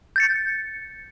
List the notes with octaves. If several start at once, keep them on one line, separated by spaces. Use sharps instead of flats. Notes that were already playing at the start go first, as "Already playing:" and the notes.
G6 A6 C#7